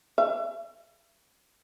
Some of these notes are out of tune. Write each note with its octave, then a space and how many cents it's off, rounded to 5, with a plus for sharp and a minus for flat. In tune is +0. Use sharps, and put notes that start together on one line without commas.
E5 +30